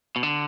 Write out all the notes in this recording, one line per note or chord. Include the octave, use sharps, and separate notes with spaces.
B2
D3